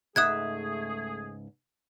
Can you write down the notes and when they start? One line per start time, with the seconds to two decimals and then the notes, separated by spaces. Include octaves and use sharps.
0.16 C#2 G#2 A3 G#4 E5 D#6 F#6 G#6